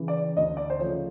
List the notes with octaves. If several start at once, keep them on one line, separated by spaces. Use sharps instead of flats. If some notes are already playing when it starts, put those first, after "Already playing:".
Already playing: C#3 E3
D5
D2 D#5
D5
C5
C#3 F3 A3 C#5